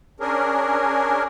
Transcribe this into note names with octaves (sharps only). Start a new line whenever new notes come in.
C#4 D4 G#4 A#4